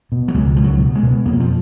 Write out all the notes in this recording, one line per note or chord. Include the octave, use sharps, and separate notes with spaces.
B2
F#3
C#2 G#3
C#2 F3
F#3
B2
G#3
B2
F2 A#3
F3